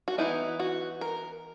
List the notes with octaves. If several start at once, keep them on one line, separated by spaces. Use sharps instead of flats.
F#4
E3 B3 D#4 E4
F#4
A#4